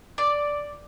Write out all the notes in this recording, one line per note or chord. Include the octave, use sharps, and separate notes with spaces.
D5